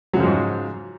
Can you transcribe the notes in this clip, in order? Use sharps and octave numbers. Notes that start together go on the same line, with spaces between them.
G#2 C#3 F3 F#3 G#3